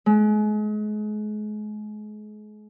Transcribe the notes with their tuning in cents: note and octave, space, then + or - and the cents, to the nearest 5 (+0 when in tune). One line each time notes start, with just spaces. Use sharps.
G#3 +35